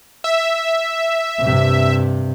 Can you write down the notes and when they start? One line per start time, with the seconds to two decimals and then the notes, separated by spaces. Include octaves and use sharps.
0.24 E5
1.42 G2 C3